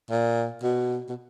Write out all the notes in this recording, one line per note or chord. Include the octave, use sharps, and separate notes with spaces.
A#2
B2
B2